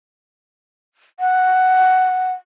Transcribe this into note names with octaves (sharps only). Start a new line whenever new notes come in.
F#5